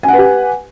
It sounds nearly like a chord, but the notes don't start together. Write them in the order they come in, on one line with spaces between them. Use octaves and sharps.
G#5 F#5 B4 G4